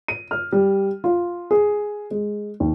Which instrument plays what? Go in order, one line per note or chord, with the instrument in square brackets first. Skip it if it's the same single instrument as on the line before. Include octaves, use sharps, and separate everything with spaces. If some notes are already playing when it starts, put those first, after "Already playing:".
[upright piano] D#7
F6
G3
F4
G#4
G#3
D#2